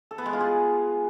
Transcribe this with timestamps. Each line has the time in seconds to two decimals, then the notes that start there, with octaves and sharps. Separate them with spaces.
0.11 A4
0.18 B3
0.26 G#3
0.33 F4
0.40 G#4